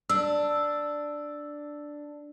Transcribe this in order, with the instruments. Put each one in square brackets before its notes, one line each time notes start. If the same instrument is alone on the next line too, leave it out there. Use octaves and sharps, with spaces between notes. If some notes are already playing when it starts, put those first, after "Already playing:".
[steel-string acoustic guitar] D4 [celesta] E6